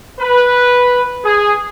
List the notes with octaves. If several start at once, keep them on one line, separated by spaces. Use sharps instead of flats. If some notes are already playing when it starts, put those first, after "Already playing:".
B4
G#4